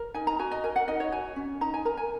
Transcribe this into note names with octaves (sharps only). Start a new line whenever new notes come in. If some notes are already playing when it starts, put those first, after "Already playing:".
Already playing: A#4
D#4 G#5
A#5
F#4 G#5
D#5
A#4 G#5
F#5
D#4 D#5
C#5
F#4 G#5
C#4
D#4 A#5
G#5
A#4 A#5
G#5